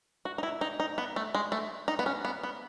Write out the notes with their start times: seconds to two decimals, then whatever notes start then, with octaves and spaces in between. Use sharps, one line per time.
0.25 F#4
0.38 D#4
0.43 E4
0.61 D#4
0.80 D#4
0.98 B3
1.16 A3
1.35 G#3
1.52 A3
1.88 D#4
1.99 B3
2.06 C#4
2.25 B3
2.43 B3